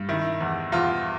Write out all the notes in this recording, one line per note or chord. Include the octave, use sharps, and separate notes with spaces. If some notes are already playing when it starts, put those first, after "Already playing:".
Already playing: G2
D#3 E4
E2
E2 F4